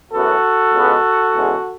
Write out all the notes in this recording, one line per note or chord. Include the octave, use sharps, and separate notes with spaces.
F#2 C#3 E3 B3 F#4 A4
C#2 B2 G#3 B3
E2 C#3 G#3